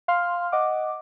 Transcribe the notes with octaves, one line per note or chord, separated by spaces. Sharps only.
F5 C6 F6
D#5 F#5 D6